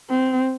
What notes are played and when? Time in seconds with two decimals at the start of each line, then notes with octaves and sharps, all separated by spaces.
0.10 C4